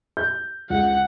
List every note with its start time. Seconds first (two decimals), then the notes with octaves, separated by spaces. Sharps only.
0.17 G6
0.70 C#2 F#5